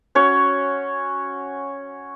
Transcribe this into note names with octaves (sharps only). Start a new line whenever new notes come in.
C#4 F#4 C#5